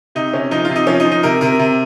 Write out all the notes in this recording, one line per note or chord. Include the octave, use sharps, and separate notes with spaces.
C3 D#4
C3 C#4
F3 D#4
C3 F4
D#4
F3 C#4
D#4
F3
D#4
C3 A#4
C3 A#4
C3